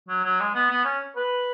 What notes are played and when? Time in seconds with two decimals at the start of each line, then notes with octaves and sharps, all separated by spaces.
0.09 F#3
0.25 F#3
0.40 G#3
0.55 B3
0.70 B3
0.85 C#4
1.16 B4